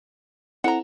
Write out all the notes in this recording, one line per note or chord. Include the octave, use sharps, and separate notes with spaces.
C4 E4 A4 F#5 A#5